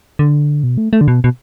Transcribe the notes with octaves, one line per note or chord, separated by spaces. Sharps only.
D3
B2
A3
A3
D3
B2
B2